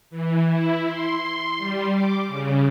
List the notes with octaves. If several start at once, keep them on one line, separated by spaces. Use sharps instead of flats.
E3
E4
C6
G3
D6
C#3